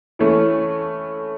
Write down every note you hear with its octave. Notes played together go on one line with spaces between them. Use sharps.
E3 A3 C#4